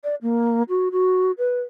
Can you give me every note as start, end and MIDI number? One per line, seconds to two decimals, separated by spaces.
0.04 0.15 74
0.22 0.63 58
0.69 0.89 66
0.92 1.31 66
1.38 1.61 71